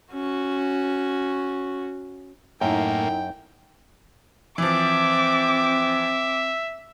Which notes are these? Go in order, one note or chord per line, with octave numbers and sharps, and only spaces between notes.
C#4 F#4
F#2 A2 A#3 D#4 E4 G5
E3 F3 C4 E5 D6